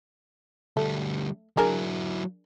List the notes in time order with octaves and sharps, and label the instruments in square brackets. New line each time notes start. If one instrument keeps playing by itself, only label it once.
[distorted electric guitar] D2 G3 [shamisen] A3
[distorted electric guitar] F#3 E4 [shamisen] D4 G#4 A#4